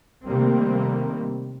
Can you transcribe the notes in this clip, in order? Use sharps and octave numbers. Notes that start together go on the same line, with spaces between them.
C3 D#3 G3 A3 A#3 C4